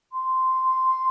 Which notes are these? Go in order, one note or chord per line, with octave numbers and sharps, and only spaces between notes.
C6